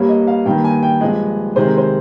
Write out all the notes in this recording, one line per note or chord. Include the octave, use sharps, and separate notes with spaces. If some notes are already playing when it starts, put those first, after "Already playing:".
Already playing: G2 G3 A#3 C#5
D#5
F5
G2 D#3 A#3 G5
G#5
G5
G2 F3 G#3 D#5
C3 D#3 G#3 C5
A#4
C5